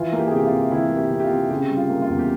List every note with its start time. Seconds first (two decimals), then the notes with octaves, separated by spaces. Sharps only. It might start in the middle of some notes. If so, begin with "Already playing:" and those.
Already playing: E3 F4
0.13 A#3
0.19 G4
0.28 G#4
0.32 C3 G4
0.45 F4
0.52 C3
0.71 E3 E4
0.91 A#3
0.97 G4
1.10 C3
1.20 G4
1.24 F4
1.31 C3
1.50 C#3 G4
1.70 G3
1.77 F4
1.89 A#3
2.02 F4
2.09 E2
2.19 G4